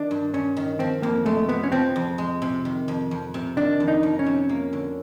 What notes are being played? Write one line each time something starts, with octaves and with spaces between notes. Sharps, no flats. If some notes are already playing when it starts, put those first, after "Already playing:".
Already playing: D#3 D4
G2
G2 C#4
D#3
F3 C4
F2 A#3
G#3 A3
C3 B3
C#4
F3 C4
F2
G#3
C3
D#3
F2
F2
C3
D#3 D4
F2
D#4
F2
C#4
C3
A#3
D3